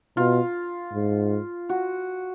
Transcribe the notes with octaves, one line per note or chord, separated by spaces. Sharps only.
B2 F4
G#2
F#4